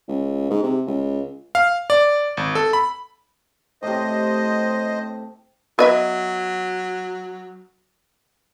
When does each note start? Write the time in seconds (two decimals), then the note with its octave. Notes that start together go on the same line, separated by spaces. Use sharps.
0.08 C#2
0.51 G#2
0.64 C3
0.87 C#2
1.55 F5
1.90 D5
2.37 G#1
2.55 A4
2.73 B5
3.83 A2 C3 C5 D#5
5.79 F#3 B3 D#5 E5